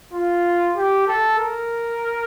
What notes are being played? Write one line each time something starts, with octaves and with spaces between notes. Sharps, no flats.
F4
G4
A4
A#4